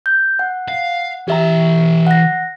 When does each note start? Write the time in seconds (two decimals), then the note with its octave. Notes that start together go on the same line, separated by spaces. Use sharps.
0.06 G6
0.39 F#5
0.68 F5
1.28 E3 G4 E5 G5 A#5
2.07 F#5 A#6